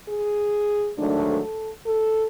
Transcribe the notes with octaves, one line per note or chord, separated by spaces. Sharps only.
G#4
G#2 D#3 F#3 A3 D4
A4
A4